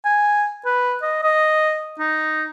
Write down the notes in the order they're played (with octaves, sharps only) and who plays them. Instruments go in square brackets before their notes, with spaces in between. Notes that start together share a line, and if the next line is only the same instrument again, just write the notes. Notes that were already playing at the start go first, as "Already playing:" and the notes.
[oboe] G#5
B4
D#5
D#5
D#4